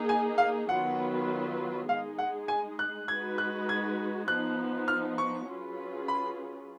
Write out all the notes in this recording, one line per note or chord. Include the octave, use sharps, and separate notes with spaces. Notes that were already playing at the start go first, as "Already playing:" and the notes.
Already playing: A#3 D#4 G#4
G#5
F5
D#3 F#3 B3 F4 B4 F#5
G#3 D#4 G#4 F5
F#5
G#5
F#6
G#3 D#4 F#4 B4 G#6
F#6
G#6
F3 B3 D#4 F#6
F6
C#6
F#3 C#4 F4 G#4 B4
B5